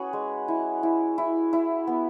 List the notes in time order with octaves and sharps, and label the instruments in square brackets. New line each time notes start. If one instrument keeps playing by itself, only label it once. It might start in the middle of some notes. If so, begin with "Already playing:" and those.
Already playing: [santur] C#4 F#4 G#4 B4
G#3
E4
E4
E4
E4
B3